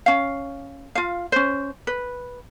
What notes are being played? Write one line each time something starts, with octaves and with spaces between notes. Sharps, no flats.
C#4 F5
F4 F5
C#4 C5
B4